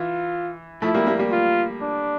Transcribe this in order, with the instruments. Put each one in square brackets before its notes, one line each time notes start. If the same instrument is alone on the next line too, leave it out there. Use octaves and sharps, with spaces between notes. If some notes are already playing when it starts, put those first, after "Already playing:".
Already playing: [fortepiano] E3 [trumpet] F4
[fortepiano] F3 A3 [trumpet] E4
[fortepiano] G3 A#3
G3 A#3
G3 A#3
[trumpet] F4
D4